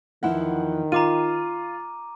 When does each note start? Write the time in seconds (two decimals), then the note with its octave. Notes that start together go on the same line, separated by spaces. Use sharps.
0.23 E2 D#3 F3 E4 F#5
0.92 F4 F5 A#5 D6 D#7